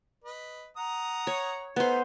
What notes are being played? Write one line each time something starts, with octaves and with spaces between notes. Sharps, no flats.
B4 D#5
F#5 A#5 D#6
C#5
A3 B3 D#4 C5